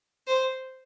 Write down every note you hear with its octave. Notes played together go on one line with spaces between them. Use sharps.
C5